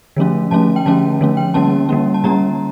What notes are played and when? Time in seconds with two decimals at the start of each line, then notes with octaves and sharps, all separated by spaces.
0.16 D3 F3 A3 C#4
0.51 D3 F3 A3 C#4 A5
0.76 G5
0.86 D3 F3 A3 C#4 A5
1.21 D3 F3 A3 C#4
1.37 G5
1.54 D3 G3 A#3 C#4 A5
1.89 D3 G3 A#3 C#4
2.14 A5
2.24 D3 G3 A#3 C#4 A#5